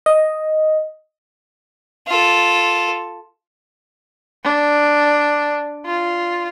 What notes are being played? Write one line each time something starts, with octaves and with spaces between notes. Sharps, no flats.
D#5
F4 A4
D4
F4